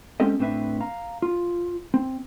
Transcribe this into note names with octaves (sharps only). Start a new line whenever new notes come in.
G#3 C4 C#4 G4 A4 D#5
A2 C4 D4 B4 E5
F5 A#5
F4
C4